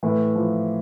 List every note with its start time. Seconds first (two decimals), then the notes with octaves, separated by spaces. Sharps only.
0.03 A2 E3
0.36 F3